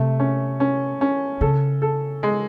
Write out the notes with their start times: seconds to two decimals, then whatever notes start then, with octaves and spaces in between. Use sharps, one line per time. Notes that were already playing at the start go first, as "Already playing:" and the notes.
Already playing: C3 A3
0.20 C#4
0.60 C#4
1.01 C#4
1.41 C#3 A4
1.82 A4
2.23 G#3